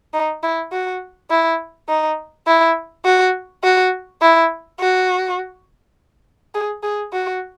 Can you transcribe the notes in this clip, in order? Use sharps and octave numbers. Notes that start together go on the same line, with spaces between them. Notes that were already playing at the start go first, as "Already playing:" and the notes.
D#4
E4
F#4
E4
D#4
E4
F#4
F#4
E4
F#4
G#4
G#4
F#4